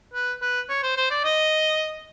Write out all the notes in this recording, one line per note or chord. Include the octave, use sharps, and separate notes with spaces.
B4
B4
C#5
C5
C5
D5
D#5